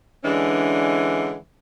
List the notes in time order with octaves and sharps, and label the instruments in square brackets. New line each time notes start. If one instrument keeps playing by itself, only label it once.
[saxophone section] D3 E3 G#3 C#4 D4